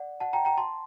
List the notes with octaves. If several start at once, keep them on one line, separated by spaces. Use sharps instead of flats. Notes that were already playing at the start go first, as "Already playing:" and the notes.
Already playing: D5 F#5
F#5 A5
G5 A#5
G5 A#5
A5 C6